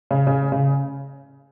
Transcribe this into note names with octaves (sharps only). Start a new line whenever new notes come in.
C#3
C#3
C#3